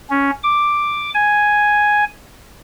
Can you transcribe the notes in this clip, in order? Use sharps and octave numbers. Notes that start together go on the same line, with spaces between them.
C#4
D6
G#5